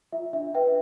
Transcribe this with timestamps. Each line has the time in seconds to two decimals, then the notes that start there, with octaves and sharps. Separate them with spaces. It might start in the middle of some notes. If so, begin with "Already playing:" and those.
0.12 F4 E5
0.33 D4 E5
0.55 B4 E5 G5